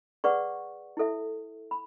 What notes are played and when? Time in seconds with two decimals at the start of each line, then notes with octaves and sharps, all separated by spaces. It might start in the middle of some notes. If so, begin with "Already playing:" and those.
0.24 G#4 B4 D5 F#5 C#6
0.97 E4 A4 E5
1.71 B5